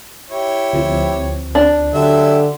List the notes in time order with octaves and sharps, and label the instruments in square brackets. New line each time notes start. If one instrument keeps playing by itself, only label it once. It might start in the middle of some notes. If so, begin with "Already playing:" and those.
[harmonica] E4 G4 C#5
[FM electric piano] D2 F3 C4
[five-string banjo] D4
[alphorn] D3 [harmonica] F#3 G4 E5